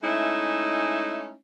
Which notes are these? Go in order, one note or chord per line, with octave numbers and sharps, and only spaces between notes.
G#3 A3 C#4 D#4 E4